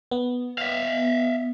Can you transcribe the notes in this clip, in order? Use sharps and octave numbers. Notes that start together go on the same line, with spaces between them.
B3
E5 F5